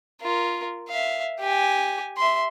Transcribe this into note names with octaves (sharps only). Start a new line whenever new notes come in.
F4 A#4
E5 F5
G4 G#5
E5 C6